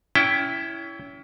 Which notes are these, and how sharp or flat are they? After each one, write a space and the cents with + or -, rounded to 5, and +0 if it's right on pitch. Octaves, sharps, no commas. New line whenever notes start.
C#4 +30 E4 +0 G5 +0